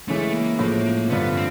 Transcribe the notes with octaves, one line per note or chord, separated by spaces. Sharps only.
C#3 E3 G#3 A3 C#4 E4
A#3
A2 F3 G#3
G2 D3 F3 B3
C4